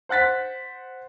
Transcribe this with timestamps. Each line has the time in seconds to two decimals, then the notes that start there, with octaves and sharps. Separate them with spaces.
0.09 C5 F#5 F#6 A6 B6